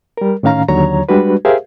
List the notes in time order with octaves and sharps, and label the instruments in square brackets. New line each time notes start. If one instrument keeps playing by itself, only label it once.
[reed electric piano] G3 A#4
A2 D#3 C#4 F5 A#5
D#2 D3 F#3 C#5 A#5
G3 G#3 D4 F#4 B4
G4 G#4 A#4 C5 E5 F5